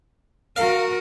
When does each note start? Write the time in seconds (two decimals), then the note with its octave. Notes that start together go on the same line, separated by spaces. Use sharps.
0.56 F#4 A#4 F5